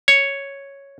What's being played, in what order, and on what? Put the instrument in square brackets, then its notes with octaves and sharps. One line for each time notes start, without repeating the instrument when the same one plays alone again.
[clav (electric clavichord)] C#5